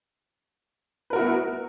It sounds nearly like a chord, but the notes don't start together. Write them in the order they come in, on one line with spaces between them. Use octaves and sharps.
B4 A#4 F#4 E4 B3